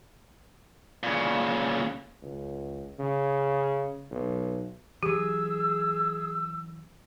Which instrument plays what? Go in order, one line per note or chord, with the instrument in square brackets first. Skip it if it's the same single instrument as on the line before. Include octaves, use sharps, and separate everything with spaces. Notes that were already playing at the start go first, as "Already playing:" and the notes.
[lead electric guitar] A#2 C#3
[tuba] C#2
C#3
B1
[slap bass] E3 F#3 [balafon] G4 [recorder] G#4 [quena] E6